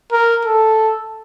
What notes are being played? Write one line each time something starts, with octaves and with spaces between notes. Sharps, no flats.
A#4
A4